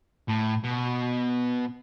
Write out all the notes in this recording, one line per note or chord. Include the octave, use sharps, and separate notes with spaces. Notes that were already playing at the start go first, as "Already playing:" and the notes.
A2
B2